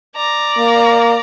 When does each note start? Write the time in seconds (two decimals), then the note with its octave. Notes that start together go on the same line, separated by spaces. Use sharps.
0.16 D5 A#5
0.59 A#3